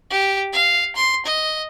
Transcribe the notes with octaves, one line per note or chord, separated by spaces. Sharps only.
G4
F5
C6
D#5